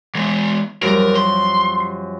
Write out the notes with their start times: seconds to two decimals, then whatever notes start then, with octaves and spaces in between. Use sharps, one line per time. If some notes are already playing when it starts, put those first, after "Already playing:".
0.15 E3 G#3
0.82 F#2 F3 G3 A#4
1.15 C6